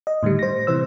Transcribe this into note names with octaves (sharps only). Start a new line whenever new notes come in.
D#5
A2 D3 D#3 G3
C5 A#6
C3 E3 C5 E6